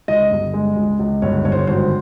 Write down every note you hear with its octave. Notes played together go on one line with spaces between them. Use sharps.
C#2 D#5
G1
G#3
C#2
C#2
G1 C#5
G1 C#5
C5
C#5
G#1 C5